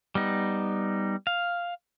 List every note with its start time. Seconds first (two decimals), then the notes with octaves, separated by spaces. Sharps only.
0.15 G3 B3 D#4
1.27 F5